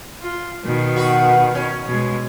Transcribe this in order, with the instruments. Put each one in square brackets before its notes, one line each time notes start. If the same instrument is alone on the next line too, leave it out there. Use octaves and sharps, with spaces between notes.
[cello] F4
B2 D#3
[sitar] F#4 B4
C#4
[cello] B2 G#3